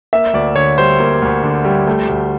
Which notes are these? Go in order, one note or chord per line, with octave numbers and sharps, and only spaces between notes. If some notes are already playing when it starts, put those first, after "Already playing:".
A#3 E5
D2 D5
D3 C#5
G3 C5
A#3
D2
D3
G3
A3
D2